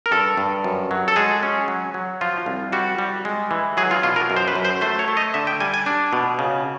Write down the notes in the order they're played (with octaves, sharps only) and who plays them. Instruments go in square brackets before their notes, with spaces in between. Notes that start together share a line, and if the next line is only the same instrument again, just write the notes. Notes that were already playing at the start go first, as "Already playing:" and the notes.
[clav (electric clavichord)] A#4
G2 A4
G2
F#2
F#3
A4
G#3 G#4
C#4
F#3
F#3
F3 F4
C2
G3 F#4
G3
G#3
E3
F#3 G#4
F4
B2 F4
A#4
F#2
C5
B4
F#2
C5
A3 C5
C#5
A3
D#5
D3 E5
G5
G3 G#5
G#5
D4
B2
C#3